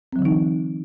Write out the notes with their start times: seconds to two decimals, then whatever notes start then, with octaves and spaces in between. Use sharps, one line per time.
0.12 C4
0.16 F#3
0.19 D3
0.22 E3
0.25 D#4